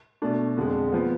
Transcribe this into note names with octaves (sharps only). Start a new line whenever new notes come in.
B2 A3 D4
F2 D3 G#3
F3 B3